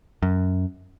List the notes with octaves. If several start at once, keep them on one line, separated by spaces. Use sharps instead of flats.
F#2